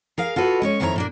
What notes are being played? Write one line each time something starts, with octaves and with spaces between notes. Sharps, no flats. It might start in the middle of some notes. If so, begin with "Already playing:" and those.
G#4 A#4 F5
F4 F#4 A4 B4
G#3 C#4 C#5
F2 D#3 G3 E4 C#5 A#5
A#2 A#3 D4